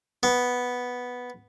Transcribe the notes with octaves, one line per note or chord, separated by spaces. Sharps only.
B3